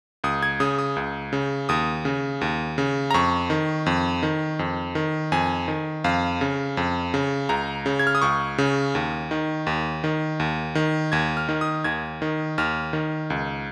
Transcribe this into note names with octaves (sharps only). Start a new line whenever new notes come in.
C#2 D#6
G#6
C#3 D#6
D#6
C#2
C#3
D#2 D#6
C#3
D#2
C#3
A#5
F2 C#6
D#3
F2
D#3
F2
D#3
F2 G#5
D#3
F2 F5
C#3
F2
C#3
C#2 A#5
C#3
G#6
F6
D#6
C#2 C#6
C#3
D#2
D#3
D#2
D#3
D#2
D#3
D#2 G#6
F6
D#3
D#6
D#2 G#6
D#3
D#2 F6
D#3
C#2